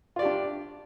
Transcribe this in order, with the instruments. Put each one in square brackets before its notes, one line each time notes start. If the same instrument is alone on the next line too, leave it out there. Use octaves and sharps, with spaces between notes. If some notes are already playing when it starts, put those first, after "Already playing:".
[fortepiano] F4
D5
G4
D4